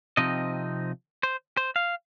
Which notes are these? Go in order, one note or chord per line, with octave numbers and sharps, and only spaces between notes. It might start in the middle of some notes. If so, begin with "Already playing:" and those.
C3 F3 C4 D#4 D#5
C5
C5
F5